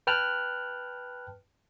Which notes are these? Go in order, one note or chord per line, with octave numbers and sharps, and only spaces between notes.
B4 G5 A5 F6 F#6